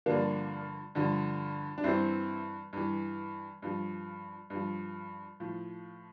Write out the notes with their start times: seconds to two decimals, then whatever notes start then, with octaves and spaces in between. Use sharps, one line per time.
0.06 G2 D3 F3 A#3 D4
0.95 G2 D3 F3
1.78 D4
1.84 G2 E3 C4 E4
2.73 G2 E3
3.62 G2 F3
4.50 G2
4.55 F3
5.40 A2 F3